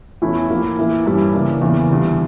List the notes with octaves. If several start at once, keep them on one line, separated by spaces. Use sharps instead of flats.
E2 E3 A3 C#4 E4
A2 F3 A#3 E4
A2 E3 A#3 E4
G2 E3 G3 C#4 E4
C#3 E3 A#3 D4
E2 C#3 E3 A#3
E2 D3 G3